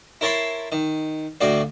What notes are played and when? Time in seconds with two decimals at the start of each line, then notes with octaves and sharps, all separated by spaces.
0.21 E4 A#4 C#5 A5 B5 C6
0.72 D#3
1.41 D2 A2 F#4 D5 F5